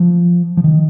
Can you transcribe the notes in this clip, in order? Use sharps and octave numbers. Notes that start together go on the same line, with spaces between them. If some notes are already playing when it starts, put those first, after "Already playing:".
Already playing: F3
F3
D#3